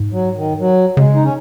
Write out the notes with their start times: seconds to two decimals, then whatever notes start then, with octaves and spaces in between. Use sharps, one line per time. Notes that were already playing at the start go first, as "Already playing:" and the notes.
Already playing: G#2
0.12 F#3
0.36 D#3
0.60 F#3
0.97 C#3 G#3
1.14 D#4
1.24 C#4